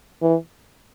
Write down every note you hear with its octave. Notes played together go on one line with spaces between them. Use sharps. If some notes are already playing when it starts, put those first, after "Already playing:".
E3